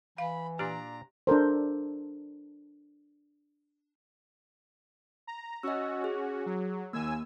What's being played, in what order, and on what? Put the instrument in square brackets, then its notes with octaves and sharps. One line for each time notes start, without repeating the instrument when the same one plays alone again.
[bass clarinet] E3 [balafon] F5 [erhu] B5
[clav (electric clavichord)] A#2 D4 D5 [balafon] G4 [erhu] A#5
[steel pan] D4 A4 A#4 C5
[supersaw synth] A#5
[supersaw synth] C#4 F#4 [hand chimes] D#5 E6
[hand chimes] G#4
[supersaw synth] F#3
[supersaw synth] D#2 G#5 E6 [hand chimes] A#3